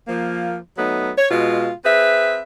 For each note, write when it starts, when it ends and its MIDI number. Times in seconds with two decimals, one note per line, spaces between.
0.08 0.57 53
0.08 0.57 58
0.78 1.11 54
0.78 1.11 57
0.78 1.11 59
0.78 1.11 63
1.18 1.28 73
1.30 1.71 47
1.30 1.71 56
1.30 1.71 65
1.85 2.42 60
1.85 2.42 68
1.85 2.42 71
1.85 2.42 76